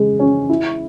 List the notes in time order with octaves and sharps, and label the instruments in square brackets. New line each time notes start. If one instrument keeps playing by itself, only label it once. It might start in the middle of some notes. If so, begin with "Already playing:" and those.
Already playing: [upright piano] C#3 G#3
C#4
E4